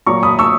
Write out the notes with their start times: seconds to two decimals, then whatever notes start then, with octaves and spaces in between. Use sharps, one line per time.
0.06 A#2 F#3 A#5 C#6
0.23 B5 D#6
0.39 C#6 E6